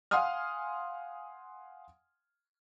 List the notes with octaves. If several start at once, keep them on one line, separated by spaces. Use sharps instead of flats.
F5 F#5 G#5 C6 D#6 F6